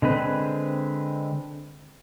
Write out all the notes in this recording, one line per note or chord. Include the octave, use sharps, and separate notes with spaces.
D3 G#3 C4 B4